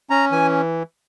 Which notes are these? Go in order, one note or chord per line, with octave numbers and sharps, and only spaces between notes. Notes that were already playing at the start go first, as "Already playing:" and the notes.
C#4 A#5
E3 G#5